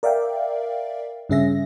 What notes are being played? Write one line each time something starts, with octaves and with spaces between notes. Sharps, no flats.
A#4 D5 E5 F5 G5
G2 C#3 C#4 G#4 E5 A#6